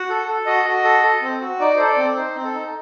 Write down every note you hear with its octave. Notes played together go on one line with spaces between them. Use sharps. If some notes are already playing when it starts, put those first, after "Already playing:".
Already playing: F#4 F#5
A4
A4
F#4 D#5
F#4
A4
A4
C4
F#4
D#4 D5
A4 C5
D5
C4
D#4 C5
C4
A4
D#4